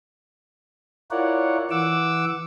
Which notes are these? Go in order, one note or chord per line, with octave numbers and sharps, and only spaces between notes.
E4 F4 A#4 C#5 D5 F#5
E3 F#5 D6 E6